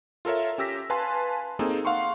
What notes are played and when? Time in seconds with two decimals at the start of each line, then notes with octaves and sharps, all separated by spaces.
0.25 F4 A4 A#4 C#5 E5
0.58 C#4 G4 E6 A#6 B6
0.90 B4 F5 G#5 A5 C6
1.59 A#3 C4 D#4 G#4 A4
1.85 F5 F#5 C6 C#6